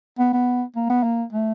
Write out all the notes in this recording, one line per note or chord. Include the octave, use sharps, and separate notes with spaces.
B3
B3
A#3
B3
A#3
A3